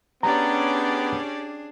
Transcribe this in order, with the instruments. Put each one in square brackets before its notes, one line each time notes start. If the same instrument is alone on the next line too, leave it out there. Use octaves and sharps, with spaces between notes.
[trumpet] B3 [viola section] C#4 G4 D5 [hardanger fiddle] D4 G#4 [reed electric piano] A#5